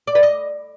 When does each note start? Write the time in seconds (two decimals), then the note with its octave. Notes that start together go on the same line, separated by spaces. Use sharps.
0.07 D5
0.15 B4
0.23 D#5